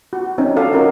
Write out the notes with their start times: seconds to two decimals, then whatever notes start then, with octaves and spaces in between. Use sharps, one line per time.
0.13 F#4
0.38 C4 C#4 D#4
0.56 F#4 A4 D5 F5
0.73 C#4 D#4 F#4 A4 A#4